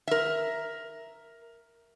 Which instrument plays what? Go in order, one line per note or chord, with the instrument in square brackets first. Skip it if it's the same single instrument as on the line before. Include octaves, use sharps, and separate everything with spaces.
[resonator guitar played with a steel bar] A#4 E5